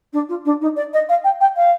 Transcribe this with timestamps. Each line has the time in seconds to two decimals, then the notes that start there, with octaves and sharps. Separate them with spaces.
0.13 D4
0.28 F4
0.45 D4
0.61 D#4
0.76 D5
0.93 D#5
1.09 F5
1.24 G5
1.40 G5
1.56 F5